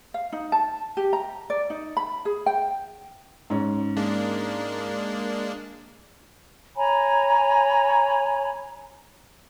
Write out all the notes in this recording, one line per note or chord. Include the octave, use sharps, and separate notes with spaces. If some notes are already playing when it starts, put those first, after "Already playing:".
F5
D#4
A5
G4
A#5
D5
D#4
B5
G#4
G5
G#2 C#4
G#3 A#3 D4
C#5 G#5 A#5 B5